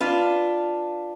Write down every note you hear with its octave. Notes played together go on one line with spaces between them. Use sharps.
D4 F4 B4